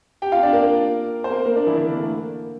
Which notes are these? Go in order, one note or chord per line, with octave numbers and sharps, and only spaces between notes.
G4 G5
F4 F5
D4 D5
A#3 A#4
C5
A#3 A#4
A#3 A#4
D4 D5
E3 E4
D3 D4
A#3
A3
A#3